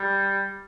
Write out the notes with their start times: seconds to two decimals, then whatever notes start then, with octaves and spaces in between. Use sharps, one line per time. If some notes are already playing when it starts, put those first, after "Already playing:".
Already playing: G3